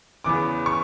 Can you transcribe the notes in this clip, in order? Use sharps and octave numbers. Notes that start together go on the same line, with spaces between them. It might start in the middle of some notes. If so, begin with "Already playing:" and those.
E2 C#3 E3 B3 D6
C#6